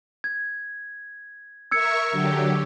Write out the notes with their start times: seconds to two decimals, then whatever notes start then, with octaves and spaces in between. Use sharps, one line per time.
0.24 G#6
1.71 A#4 E5 C#6 E6 G#6 C#7
2.12 D3 F#3 G4